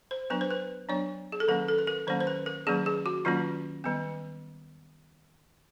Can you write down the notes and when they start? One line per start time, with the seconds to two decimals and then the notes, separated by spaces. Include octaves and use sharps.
0.11 C5
0.30 F#3 B3 D4 B4
0.41 C5
0.50 B4
0.89 F#3 B3 D4 C#5
1.32 G#4
1.40 A4
1.48 D#3 F#3 A#3 C#4 A#4
1.68 A4
1.78 B4
1.87 A#4
2.07 D#3 F#3 A#3 C#4 C5
2.20 C5
2.27 B4
2.46 A#4
2.67 D#3 F#3 A#3 C#4 G#4
2.86 G#4
3.06 F#4
3.25 D#3 F#3 A#3 C#4 F4
3.84 D#3 G3 B3